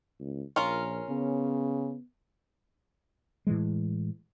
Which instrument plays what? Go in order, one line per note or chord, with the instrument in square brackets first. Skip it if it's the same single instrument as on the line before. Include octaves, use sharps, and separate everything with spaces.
[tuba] C#2
[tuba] A#1 [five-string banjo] C#4 F4 A#4
[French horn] C#3 [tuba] B3
[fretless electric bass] A2 E3 G#3